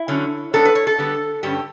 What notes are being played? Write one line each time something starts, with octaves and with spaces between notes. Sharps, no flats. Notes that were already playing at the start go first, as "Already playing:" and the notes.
Already playing: E4
D3 F#3 C#4
G2 F#3 B3 D4 A4
B4
C#5
A4
D3 G3 B3
G2 D3 G3 C#4 G4